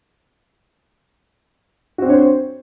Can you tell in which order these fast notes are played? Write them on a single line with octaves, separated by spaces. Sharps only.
F#4 C4 D4 C#5 C5